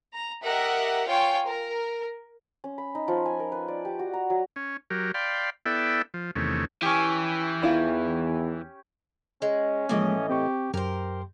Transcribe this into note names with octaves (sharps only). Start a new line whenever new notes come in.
A#5
G4 A#4 D#5 E5 F#5
F4 C#5 F5 G5 G#5
A#4
C#4
B5
D#4
F3
G#5
A#4
B4
D5
G4
F#4
A#5
F#3
C#4
F#3 G4 A#4
D5 F5 G5 B5 C6
B3 E4 A4 D5 E5 G5
F3
E2 C3 D#3 A3 C#4
E3 C#4 G4
E2 D#3 E4 F4
G#3 C#4
A2 E3 F3 G#3 A#3 D#5
C4 G4 C#6
F#2 G4 A#4 C5